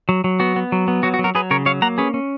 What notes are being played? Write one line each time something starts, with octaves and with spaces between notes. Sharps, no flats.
F#3
F#3
B3 F#4
B3
F#3
B3
F#3 F#4
F#4
F#3
F#4 A#4
F#3 G#4 B4
C#3 A#4 C#5
F#3 C#5 F5
A#3 F#5 A#5
C#4 G#4 B4
C#4